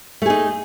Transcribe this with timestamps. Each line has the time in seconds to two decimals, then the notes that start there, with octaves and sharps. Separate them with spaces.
0.22 A3
0.26 G#4
0.30 D#4